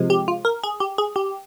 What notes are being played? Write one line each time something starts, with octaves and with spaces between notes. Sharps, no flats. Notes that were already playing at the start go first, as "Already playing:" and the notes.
Already playing: C3 F3 G#3
G4
F4
A#4
G#4
G4
G#4
G4